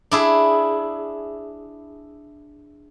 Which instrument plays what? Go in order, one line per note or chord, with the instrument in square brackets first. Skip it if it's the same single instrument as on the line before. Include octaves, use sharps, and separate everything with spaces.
[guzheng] D4 E4 G#4